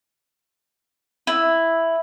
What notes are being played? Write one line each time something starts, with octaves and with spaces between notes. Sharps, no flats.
E4